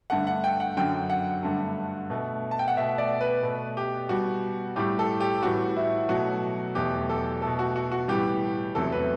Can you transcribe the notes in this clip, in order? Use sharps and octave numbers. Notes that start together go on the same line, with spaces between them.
G2 D3 A3 F#5
F#5
G5
F#5
F#2 D3 F#3 G5
F#5
G2 D3 A3
B2 A3
A5
G5
F#5
B2 A3 E5
D5
B4
B2 A3
G4
B2 G3 F#4
A2 G3 G4
A4
G4
A2 E3 G3 F#4
E4
B2 F#3 A3 F#4
E2 B2 F#3 A3 G4
A4
B2 A3 A4
F#4
F#4
F#4
A2 E3 G3 G4
E2 C3 F#3 A3 A4
B4